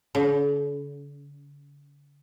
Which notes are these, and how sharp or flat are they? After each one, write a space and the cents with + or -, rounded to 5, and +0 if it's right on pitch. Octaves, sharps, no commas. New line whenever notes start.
D3 -45